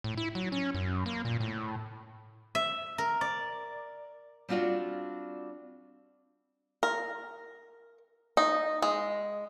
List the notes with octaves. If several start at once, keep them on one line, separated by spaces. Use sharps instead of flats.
A2
E4
F#3
C#4
F#2
A#3
A#2
A2
E5
A#4
D5
G3 C4 D4 F4 F#4 D5
A#4
D#4
G#3